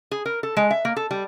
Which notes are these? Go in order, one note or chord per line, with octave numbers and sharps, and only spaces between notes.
G#4
A#4
A4
G#3
E5
A#3
A4
G3